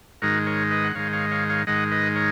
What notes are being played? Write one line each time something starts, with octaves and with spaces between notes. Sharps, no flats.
G#2 D#3 G#3 F#4 A#4
A#4 C#5
B4 D#5
F#5
G#2 D#3 G#3 C#5 F5
C#5 F5
C#5 F5
C#5 F5
G#2 D#3 G#3 D#5 F#5
B4 D#5
A#4 C#5